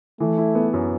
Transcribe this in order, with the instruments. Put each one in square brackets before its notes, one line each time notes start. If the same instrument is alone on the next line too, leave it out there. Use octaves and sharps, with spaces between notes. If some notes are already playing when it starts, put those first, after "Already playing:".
[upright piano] E3 [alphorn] A3
[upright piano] E4
B3
F#2